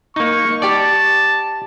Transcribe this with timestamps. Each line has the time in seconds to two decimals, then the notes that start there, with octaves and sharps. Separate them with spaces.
0.16 A#3 D#4 C#6
0.62 G4 D5 A5